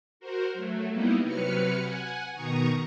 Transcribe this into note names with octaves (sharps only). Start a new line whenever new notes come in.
F#4 A#4 C5
F#3 A3
G3 A#3 B3 D#4 E4
C3 F#3 B4 F6 C#7
F#5 G#5
B2 D#3 A#5 C#6 D#6